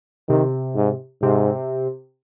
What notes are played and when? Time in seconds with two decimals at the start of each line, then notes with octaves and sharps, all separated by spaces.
0.29 C3 D#3
0.75 G#2
1.22 G#2 C3